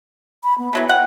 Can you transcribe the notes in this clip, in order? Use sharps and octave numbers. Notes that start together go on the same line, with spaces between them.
B5
B3
E3 F#3 A3 E5
F#5 G5